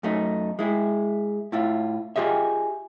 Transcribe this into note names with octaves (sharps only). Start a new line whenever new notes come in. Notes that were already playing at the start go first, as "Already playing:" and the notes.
F#2 A3 D#4
G#3 E4 G#4
A2 E4 F4
F4 G4 G#4 D#5 E5